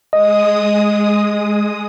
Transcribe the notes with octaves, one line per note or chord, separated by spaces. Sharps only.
G#3 D#5 D#6